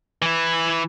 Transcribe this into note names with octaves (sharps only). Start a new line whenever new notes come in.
E3 E4